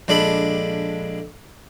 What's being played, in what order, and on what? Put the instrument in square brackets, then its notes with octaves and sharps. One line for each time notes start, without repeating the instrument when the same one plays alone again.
[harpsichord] A#1 G#3 D4 A4 B5